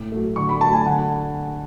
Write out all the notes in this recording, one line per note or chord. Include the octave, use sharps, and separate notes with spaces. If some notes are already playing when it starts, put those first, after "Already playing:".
Already playing: A2
F#3 A3
D3 C#6
B5
F#3 A3 A5
G#5
D3 F#5